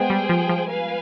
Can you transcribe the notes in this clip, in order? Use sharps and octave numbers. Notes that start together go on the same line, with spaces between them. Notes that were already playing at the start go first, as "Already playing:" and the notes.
Already playing: G#3 B3 G#4 C5 G5
G3
F3
F3
B4 F5 G#5